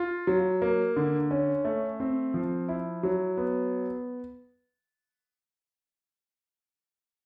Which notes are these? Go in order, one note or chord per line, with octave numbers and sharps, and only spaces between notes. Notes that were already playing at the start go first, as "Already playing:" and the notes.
Already playing: F4
F#3
A#3
D3
C#4
A3
C4
F3
E4
F#3
B3